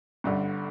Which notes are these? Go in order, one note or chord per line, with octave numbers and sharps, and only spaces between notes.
G1 G2 D3